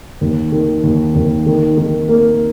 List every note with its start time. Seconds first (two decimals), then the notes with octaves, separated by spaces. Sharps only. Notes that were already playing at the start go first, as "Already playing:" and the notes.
0.21 D#2
0.52 D#3
0.83 D#2
1.15 D#2
1.46 D#3
1.77 D#3
2.09 A#3